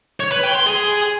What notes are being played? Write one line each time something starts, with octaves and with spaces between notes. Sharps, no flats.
C#5
B4
G5
C6
G#4